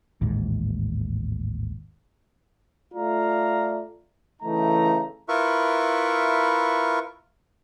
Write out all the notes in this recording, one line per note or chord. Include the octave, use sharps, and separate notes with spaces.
A1 D#2 G#2
A3 F4 D5 F5 A#5
C#3 E3 A3 D#4 A#5
E4 F4 A#4 B4 E5 C#6